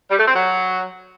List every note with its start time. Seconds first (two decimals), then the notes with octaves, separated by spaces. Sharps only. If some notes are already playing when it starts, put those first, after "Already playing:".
0.11 G3
0.19 A3
0.27 C4
0.35 F#3